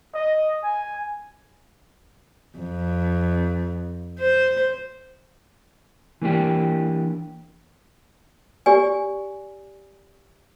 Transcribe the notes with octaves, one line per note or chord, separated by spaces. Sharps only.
D#5
G#5
F2
C5
E3 A#3 D4 G4
G4 D5 G#5